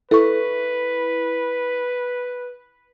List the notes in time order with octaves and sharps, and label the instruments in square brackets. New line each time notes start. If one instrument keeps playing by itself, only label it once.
[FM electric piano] E4 [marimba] A4 C#6 [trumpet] B4